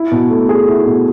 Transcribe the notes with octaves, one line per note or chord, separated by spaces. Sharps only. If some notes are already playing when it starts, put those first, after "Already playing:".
Already playing: E4
B2
A3
G#4
E4
B2